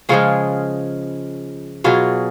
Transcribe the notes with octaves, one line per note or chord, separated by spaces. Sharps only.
C#3 F3 G#3 F4 G#4
B2 F#3 F4 G#4